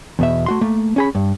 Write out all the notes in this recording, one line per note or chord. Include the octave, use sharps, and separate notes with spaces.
E2 B2 E5
A3 F#4 C6
A3 A#3
C#4 G#4 B5
G2